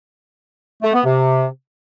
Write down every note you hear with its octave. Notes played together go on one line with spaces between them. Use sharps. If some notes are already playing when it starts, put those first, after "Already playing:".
A3
B3
C3